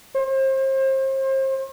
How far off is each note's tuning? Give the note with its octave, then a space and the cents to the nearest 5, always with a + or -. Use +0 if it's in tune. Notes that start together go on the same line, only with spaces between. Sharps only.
C5 +35